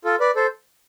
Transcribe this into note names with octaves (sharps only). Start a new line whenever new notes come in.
F4 A4
B4 D5
A4 C5